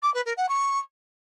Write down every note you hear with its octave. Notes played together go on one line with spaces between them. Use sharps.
D6
B4
A#4
F#5
C#6